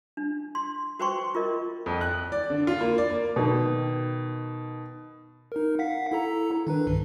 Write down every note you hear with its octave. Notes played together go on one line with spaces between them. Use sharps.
D4
C6
F#4 B4 C5 G5 C6 C#6
F4 A#4 D#5
F2
F#6
D5
D3
F4
A#3
D5
A#3
B2 D#3
D#4 A#4
F5 F#5 B6
E4 A4 A#5
D#3 D4 B4
C2 G2